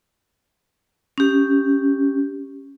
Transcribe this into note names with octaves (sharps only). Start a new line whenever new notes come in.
C#4 G4